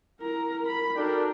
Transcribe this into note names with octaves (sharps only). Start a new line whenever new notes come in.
E4 A#4 A#5
A#4 B5
D4 D#4 F#4 A4 A#4 G5